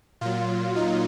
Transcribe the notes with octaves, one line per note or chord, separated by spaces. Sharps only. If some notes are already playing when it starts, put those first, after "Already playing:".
A#2 F#3 F4
D#4